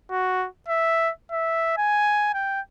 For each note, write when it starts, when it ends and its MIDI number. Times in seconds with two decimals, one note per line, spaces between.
0.11 0.47 66
0.68 1.11 76
1.32 1.73 76
1.78 2.30 80
2.34 2.60 79